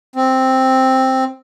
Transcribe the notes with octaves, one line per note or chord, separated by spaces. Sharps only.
C4